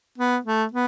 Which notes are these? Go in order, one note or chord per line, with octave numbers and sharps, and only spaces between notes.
B3
A3
B3